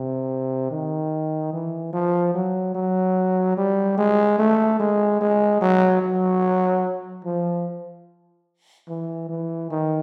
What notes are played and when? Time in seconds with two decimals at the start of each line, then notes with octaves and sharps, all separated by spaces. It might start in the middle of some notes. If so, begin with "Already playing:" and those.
Already playing: C3
0.71 D#3
1.53 E3
1.93 F3
2.34 F#3
2.75 F#3
3.57 G3
3.98 G#3
4.39 A3
4.79 G#3
5.21 G#3
5.61 F#3
6.02 F#3
7.25 F3
8.89 E3
9.29 E3
9.70 D#3